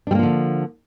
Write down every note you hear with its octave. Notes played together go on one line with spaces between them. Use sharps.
D3 F3 G3 A#3 D4